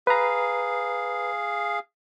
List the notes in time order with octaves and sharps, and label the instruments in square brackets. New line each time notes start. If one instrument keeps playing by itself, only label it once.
[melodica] G#4 F5 [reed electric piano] B4 A#5